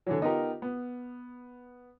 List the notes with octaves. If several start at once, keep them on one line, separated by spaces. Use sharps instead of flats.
D3 E3 F#3
B3 D#4 F4 G4 A#4
B3